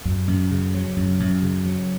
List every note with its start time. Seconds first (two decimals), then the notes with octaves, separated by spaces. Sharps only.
0.05 F#2
0.28 F#2
0.51 C#3
0.75 F#3
0.97 F#2
1.20 F#2
1.43 C#3
1.66 F#3